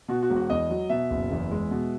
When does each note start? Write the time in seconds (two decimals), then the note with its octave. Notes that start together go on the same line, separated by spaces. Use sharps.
0.08 B2 F#4
0.22 F#4
0.30 E1
0.36 F#4
0.50 E2 D#5
0.70 F#3
0.90 B2 E5
1.11 F#1
1.31 E2
1.51 G#3
1.71 B2